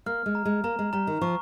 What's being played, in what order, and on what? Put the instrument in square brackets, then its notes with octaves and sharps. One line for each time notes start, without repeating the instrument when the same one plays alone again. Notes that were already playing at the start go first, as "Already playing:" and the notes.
[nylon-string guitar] A#3 [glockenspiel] F6
[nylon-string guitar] G#3
[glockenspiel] A#5
[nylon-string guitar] G#3
[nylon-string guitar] A#3 [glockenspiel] A#5
[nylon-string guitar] G#3
[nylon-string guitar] G3 [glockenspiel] A#5
[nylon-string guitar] D#3
[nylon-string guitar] F3 [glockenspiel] C#6